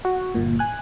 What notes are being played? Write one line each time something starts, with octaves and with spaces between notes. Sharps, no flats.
F#4
G1 A#2
G#5 F#6